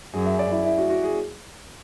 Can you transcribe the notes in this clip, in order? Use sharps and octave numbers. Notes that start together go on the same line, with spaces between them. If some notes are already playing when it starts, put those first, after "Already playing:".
F#2 G#4
E5
D5
E4
E4
F#4
F#4
G#4